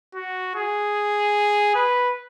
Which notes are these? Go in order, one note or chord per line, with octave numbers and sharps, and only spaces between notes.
F#4
G#4
B4